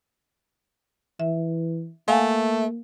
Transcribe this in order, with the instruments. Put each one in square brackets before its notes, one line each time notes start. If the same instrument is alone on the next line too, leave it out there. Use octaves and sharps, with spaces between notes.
[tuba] E3 [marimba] E5
[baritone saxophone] A3 [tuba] A#3 [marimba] F5 F#5 G#5